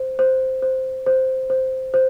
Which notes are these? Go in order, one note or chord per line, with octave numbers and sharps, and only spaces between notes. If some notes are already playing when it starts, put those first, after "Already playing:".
Already playing: C5
C5
C5
C5
C5
C5